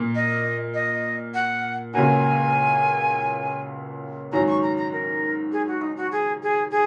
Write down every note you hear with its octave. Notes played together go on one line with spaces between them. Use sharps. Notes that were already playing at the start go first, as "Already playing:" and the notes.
Already playing: A#2 A#3
D#5
D#5
F#5
C#2 C#3 A#3 F#4 G#5
G#2 D#3 F#3 C#4 A#5
C#6
A#5
A#5
A#4
G#4
F#4
D#4
F#4
G#4
G#4
G#4